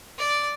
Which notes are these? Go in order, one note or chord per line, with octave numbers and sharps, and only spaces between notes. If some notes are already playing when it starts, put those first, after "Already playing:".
D5